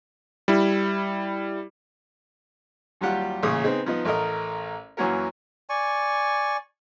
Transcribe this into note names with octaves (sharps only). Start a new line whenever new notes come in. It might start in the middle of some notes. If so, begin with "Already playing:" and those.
G3 E4
D#2 F#3 G3 F4 G4 F#5
A1 A#2 C#3 D#6
B3 C4 D#4 G#4
F3 B3 D#4
A1 A3 A#4 D#5
F#2 E3 A#3 C#4 F#4 A#4
D5 G#5 C#6